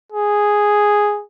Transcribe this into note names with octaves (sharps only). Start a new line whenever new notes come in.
G#4